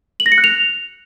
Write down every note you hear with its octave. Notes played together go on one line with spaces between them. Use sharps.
F#7
A#6
C#7
F#6
F7